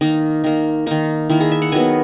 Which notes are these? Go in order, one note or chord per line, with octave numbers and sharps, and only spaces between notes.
D#3 A#3 D#4
D#3 A#3
D#3 A#3 D#4
D#3 A#3 E4
G#4
E5
F#5
D#3 F#3 B3 G#5